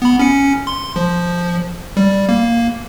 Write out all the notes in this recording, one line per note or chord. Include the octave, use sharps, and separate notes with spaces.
B3 B5
C#4 C#7
C6
F3
G3
A#3